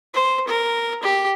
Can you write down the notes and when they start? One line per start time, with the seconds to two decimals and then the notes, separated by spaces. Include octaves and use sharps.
0.14 C5
0.47 A#4
1.03 G4